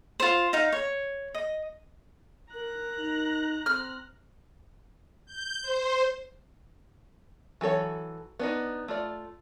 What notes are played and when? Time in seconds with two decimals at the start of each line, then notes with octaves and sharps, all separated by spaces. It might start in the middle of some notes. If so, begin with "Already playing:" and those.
0.20 F4 C5
0.53 D#4 F5
0.72 C#5
1.34 D#5
2.54 A#4 A#5 F#6
2.98 D#4
3.66 C4 F6
5.25 G6
5.62 C5
7.61 E3 F#3 A4 C#5
8.39 B3 D4 D#4
8.88 A3 F4 D5